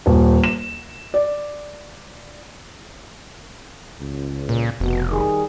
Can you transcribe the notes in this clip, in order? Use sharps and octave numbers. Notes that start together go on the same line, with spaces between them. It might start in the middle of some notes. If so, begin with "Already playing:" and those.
D#1
E7
D5
C#2
A#2
F1 B2
D#3 G3 G#4